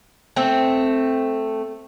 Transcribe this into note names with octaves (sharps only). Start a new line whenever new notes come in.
A3 C4